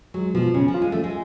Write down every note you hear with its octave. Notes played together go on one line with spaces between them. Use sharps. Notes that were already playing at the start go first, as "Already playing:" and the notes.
F#3 G#3
B2 F3
C#3 C#4
F3
F4
G#3
F3 A3
G#3